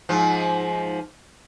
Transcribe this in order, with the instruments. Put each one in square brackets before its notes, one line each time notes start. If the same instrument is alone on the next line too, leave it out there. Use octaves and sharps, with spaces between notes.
[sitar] G#2 F3